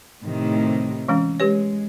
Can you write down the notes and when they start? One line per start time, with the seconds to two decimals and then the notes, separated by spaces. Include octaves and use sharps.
0.23 A2 C3 D#3
1.08 E3 G#3 C#4
1.40 G#3 G4 B4 C#5